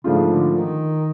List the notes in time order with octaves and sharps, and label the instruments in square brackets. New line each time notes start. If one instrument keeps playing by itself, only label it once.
[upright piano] G#2 F3 A3 D4 F4 [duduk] C#3
[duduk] D3
D#3